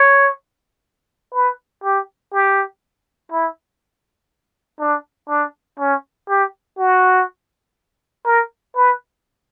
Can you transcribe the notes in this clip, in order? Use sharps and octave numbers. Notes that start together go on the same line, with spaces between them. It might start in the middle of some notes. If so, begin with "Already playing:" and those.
Already playing: C#5
B4
G4
G4
E4
D4
D4
C#4
G4
F#4
A#4
B4